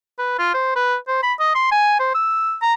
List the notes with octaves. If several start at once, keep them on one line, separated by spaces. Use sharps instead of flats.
B4
F4
C5
B4
C5
B5
D#5
C6
G#5
C5
E6
A#5